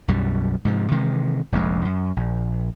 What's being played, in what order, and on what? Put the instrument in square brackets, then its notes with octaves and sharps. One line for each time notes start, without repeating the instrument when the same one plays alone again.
[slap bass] B1 F#2 B2 G3
G#2 C3 F3
C3 D#3 E3 G#3
F1 A#1 F2 G#3
F#2
A#1